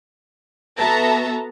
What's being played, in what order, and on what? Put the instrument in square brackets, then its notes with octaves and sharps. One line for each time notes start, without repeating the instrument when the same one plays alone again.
[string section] B3 F#4 A4 E5 A5 A#5